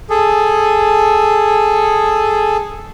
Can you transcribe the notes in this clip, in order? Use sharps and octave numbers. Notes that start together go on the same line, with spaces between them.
G#4 A4